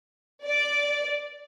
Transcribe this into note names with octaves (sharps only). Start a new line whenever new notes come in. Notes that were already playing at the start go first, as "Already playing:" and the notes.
D5